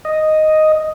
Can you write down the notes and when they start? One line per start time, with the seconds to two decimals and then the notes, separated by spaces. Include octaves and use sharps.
0.05 D#5